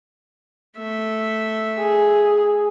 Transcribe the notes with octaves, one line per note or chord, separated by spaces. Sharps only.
A3 E5
G#4